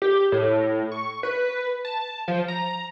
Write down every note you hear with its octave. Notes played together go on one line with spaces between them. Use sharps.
G4
A2
C#6
B4
A5
F3
A#5